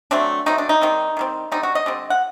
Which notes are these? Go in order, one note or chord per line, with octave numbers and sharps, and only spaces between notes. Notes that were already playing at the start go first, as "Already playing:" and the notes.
F#3 A3 C4 D4
F#3 A3 C4 D#4
D4
D#4
D#3 G3 C4
D#3 G3 C4
D3 G3 C4 D#4
F#4
D#5
D3 G3 C4
F#5